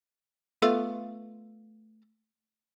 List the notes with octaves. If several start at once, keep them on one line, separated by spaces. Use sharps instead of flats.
A3 B3 F4